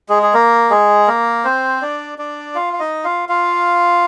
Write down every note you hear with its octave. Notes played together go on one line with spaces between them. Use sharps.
G#3 G#4
G#4
A#3 A#4
G#3 G#4
A#3 A#4
C4 C5
D4 D5
D4 D5
F4 F5
F5
D#4 D#5
F4 F5
F4 F5